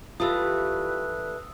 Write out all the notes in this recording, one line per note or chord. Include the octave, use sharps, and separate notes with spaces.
E3 G3 A3 F4 B4 D#6 E6